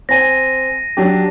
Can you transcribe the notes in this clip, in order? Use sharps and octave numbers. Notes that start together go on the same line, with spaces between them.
C4 G#5 A#6 D#7
F#3 D4 G4